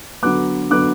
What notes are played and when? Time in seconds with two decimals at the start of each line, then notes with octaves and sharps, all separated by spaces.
0.23 D3 F#3 B3 D6 F#6
0.70 D3 F#3 B3 D6 F#6